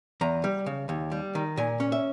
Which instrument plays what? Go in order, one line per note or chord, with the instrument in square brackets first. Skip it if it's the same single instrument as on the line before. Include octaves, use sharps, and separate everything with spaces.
[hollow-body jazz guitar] E2 A#5
G3
C#3
D#2
G3
D#3
A#2 G#5
C#4
E5